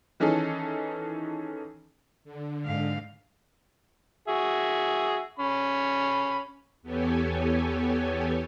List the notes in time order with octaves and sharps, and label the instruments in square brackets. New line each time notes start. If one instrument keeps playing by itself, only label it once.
[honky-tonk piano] D#3 E3 C#4 D#4 G#4 A4
[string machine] D3
[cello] G#2 F5
[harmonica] F#4 G#4 E5
C#4 B5
[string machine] E2 B3 G4 A4 C#5 G#5